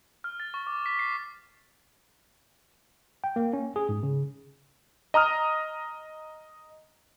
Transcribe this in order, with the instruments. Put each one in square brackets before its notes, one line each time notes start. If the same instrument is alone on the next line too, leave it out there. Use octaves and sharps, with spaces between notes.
[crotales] F6
A6
C#6
D6
B6
C7
[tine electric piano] G5
A#3
C#4
G#4
G#2
C#3
[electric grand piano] D#5 A#5 D#6 F6